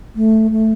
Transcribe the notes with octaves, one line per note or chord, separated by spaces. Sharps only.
A3
A3